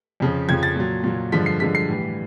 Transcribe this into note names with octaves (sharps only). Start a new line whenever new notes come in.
F2 C#3 F3
F2 C#3 F3 G#6
A6
A#2 F#3
A#2 F#3
G2 D3 F3 G#3 B6
C7
G2 D3 F3 G#3 B6
C7
A2 E3 G3